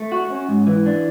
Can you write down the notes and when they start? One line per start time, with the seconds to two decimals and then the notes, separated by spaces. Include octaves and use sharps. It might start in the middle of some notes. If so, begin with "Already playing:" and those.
Already playing: A3
0.12 F#4
0.30 C#4
0.49 G#2
0.67 E3
0.86 D4